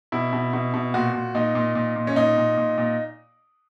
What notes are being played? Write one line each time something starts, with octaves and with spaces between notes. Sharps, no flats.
B2 E4
B2
B2
B2
A#2 F#4
A#2
A#2 D#4
A#2
A#2
A#2
C#4
A#2 D#4
A#2
A#2
A#2